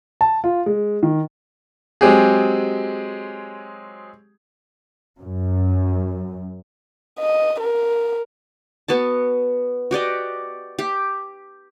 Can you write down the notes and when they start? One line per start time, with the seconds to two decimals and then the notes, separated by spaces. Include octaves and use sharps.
0.21 A5
0.44 F4
0.66 G#3
1.03 D#3
2.01 F#3 G#3 C4 G4 G#4
5.17 F#2
7.20 D#5
7.61 A#4
8.88 B3 F#4 A5
9.91 F#4 G4 D5 D#5
10.79 G4